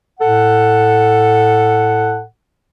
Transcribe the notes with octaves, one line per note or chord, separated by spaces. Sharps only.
A2 A4 F#5